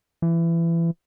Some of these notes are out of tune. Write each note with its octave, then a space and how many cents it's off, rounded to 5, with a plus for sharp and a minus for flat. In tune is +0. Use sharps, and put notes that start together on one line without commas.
E3 +25